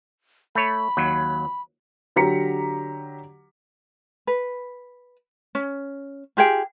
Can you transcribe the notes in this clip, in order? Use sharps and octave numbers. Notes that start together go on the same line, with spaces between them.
A3 C#5 B5
D#2 F#3
D3 F#3 G4 A#5 B6 C#7
B4
C#4
F4 G4 G#4 G5